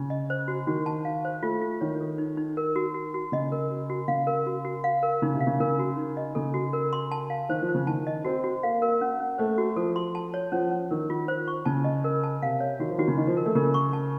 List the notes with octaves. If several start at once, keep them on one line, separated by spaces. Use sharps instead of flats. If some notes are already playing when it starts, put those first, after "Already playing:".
Already playing: C#3
D#5
C5
F#4
D#3 F#4
A5
F5
C5
A3 F4
F4
D#3 C#5
A4
D#4
D#4
A#4
F#4
F#4
F#4
C#3 D#5
A#4
F#4
F#4
C#3 F5
A#4
F#4
F#4
F5
A#4
C#3 D#4
C3
F5
C#3
C#3 A#4
F#4
D#4
D#5
C#3 A4
F#4
A#4
C6
A5
F5
D#3 C5
F3
C5
C#3
D#3 A5
D#5
C4 F#4
F#4
A#3 F5
A#4
C#4
C#4
A3 C5
F#4
F3 A4
C6
A5
C#5
F3 C#4
C#4
D#3 A#4
F4
C5
C#6
C#3 A5
D#5
A#4
A5
C3 F5
C#5
D#3 F#4
F3
D#3 F#4
C#3
D#3 D#5
F3
A#4
A3
C#3 A#4
C#6
A5